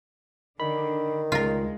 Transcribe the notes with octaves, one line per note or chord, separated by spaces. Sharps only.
D3 D#3 B5
C#2 G#3 F4 A#4